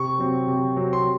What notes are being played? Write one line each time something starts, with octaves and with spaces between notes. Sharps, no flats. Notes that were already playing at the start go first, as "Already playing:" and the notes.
Already playing: C3 C#6
F#3 C4
C3
F#3 C4
C6